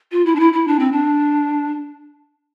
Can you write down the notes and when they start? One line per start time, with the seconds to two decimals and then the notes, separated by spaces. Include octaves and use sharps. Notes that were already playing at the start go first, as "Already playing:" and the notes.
0.12 F4
0.26 E4
0.35 D4
0.40 E4
0.53 E4
0.68 D4
0.79 C4
0.92 D4